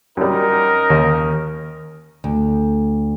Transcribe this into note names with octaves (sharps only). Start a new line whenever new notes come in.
F#2 G3 C#4 D#4 A#4
D#2
D2